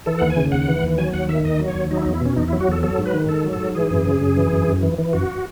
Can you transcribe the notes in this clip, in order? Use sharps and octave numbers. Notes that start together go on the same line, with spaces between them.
E3 A4
D#2 F#5
G#5
C#3
D#2 F#5
E3
D#2
F#3 G#5
D#2 F#5
D#3 E5
D#2 D#5
F#3
C#5
D#2
F#3 D#4
E4
D#4
E2
E4
B2 C#4
E2 D#4
E4
F#3
F#4
E2 A4
F#3 A4
G#2
B4
D#3
G#2 A4
F#3
A4
G#2
E3 G#4
F#2
C#3
F#2
E3
F#2
F#2
E3
E3
F#2 F#4